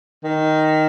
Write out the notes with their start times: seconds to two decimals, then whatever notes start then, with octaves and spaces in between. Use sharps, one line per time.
0.24 D#3